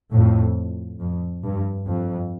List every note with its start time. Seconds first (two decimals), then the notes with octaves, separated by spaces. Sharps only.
0.11 F2 A2
1.00 F2
1.44 G2
1.88 F2